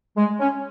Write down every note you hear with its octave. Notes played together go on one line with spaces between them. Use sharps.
G#3
C#4